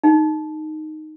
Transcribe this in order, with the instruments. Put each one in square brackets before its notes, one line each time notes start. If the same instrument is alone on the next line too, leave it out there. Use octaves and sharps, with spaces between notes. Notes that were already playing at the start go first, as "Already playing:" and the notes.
[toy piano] D#4